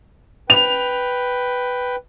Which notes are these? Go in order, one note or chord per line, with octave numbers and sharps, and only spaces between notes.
B4 G5 F7